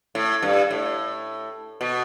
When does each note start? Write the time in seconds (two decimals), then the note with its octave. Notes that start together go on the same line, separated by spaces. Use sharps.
0.15 A2
0.42 G2
0.71 A2
1.81 B2